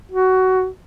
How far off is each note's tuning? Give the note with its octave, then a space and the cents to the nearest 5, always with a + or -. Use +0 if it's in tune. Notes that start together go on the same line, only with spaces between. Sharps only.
F#4 +15